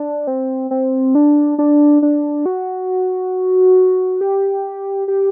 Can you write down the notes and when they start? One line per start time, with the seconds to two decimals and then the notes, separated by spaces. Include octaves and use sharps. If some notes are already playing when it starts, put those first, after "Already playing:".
Already playing: D4
0.27 C4
0.71 C4
1.15 D4
1.59 D4
2.02 D4
2.46 F#4
4.21 G4
5.08 G4